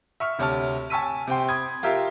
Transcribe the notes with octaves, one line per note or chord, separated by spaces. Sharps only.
E5 C#6 F6
D2 C3 C#5 A5 F6
G#5 A5 C#6 E6 B6 D#7
C3 C4 G5 C6
B5 D#6 G#6
F4 G4 A#4 E5 F5